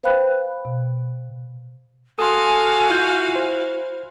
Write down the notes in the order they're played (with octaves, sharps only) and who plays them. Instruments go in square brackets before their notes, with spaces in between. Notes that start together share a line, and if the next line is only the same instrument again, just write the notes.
[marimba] B4 C5 F5 G5 B5 F#6
B2
[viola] F#4 F5 [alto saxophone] A4 [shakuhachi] G#5 [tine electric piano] C6 D#6
[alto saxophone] E4 [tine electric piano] F4 G6
[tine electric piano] C5